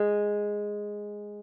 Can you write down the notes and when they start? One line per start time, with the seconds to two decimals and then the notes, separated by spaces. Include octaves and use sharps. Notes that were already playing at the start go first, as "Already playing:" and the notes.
Already playing: G#3